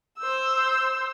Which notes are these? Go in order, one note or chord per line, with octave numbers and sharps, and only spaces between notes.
C5 E6